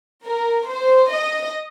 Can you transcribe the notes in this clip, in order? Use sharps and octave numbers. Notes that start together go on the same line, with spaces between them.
A#4
C5
D#5